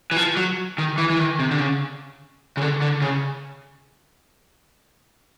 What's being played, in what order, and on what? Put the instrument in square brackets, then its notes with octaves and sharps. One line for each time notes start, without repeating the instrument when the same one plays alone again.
[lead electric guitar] E3
F3
F#3
D#3
E3
E3
D#3
C3
D3
C#3
C#3
D3
D3
C#3